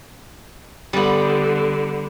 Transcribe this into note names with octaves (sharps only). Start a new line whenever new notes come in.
D3 G3 B3